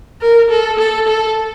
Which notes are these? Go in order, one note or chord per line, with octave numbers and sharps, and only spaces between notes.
A#4
A4
A4
A4